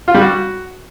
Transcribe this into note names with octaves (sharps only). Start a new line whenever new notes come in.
F4
G3
F#4